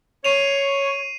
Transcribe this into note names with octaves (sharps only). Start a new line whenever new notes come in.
C#5 C7 D#7 F7